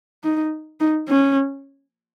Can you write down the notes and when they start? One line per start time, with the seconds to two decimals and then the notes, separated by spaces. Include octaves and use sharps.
0.23 D#4
0.80 D#4
1.09 C#4